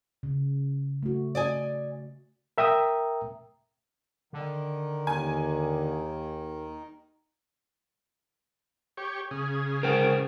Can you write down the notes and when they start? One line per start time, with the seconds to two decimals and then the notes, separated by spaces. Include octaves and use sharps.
0.23 C#3
1.03 A3 F#4
1.35 D5 D#5 G#5
2.58 A#4 E5 G5 A#5 D#6
4.33 D3 D#3
5.07 D#2 G#5
8.97 G4 C#5
9.31 C#3 G#4
9.83 A#4 C5 G5